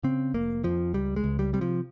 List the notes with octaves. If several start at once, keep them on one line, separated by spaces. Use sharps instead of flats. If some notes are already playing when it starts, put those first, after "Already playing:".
C#3 C4
F1 A#3
F2 F3
C#2 G3
G#3
C#2
G3
C3 G3
F3